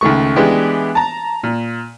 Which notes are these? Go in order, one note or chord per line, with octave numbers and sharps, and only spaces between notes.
C#2 D#3 A3 C#6
E3 G#3 B3 D4 G4
A5 A#5
A#2